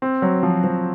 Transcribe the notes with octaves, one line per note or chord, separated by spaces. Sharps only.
C4
F#3
F3
F3